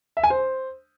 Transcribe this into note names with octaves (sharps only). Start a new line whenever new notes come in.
E5
G#5
C5